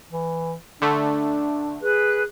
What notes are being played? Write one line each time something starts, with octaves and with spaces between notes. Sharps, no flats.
E3
D3 A3 D4
G#4 B4 F#6